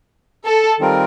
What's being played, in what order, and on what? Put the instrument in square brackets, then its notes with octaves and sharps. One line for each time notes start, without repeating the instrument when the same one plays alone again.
[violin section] A4
[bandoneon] D#3 G3 C4 F4 A#4